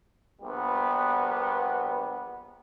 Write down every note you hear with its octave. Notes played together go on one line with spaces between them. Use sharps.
A#1 G3 B3